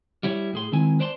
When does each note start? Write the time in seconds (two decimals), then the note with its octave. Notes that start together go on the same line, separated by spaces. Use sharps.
0.23 G3 E4 C#5
0.53 A2 G#4 C6
0.72 D#3 G#3 C4 E4 G#5
0.99 B4 C5 D5 A5 A#5 C6